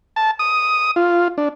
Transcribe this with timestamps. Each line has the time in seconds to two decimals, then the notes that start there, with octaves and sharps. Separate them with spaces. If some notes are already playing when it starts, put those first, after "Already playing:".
0.16 A5
0.39 D#6
0.96 F4
1.38 D4